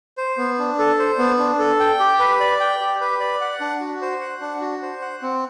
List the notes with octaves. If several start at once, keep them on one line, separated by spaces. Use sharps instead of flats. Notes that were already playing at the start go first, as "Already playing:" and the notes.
C5
B3
D4
A4
C5
B3
D4
A4
G5
G4
B4
D5
G5
G4
B4
D5
F#5
D4
F#4
C5
F#5
D4
F#4
C5
F#5
C4